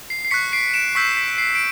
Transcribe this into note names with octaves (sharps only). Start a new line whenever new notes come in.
C7
C7
C#6 F#6 B6 C#7
C7 D7
D7 E7
C#6 E6 G6 B6
B6
C7
D7